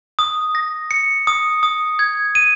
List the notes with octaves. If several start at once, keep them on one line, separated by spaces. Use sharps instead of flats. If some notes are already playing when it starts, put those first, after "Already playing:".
D#6
A#6
C#7
D#6
D#6
G#6
D#7